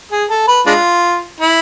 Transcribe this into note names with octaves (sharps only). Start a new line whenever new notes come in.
G#4
A4
B4
G#3 D4 F4
E4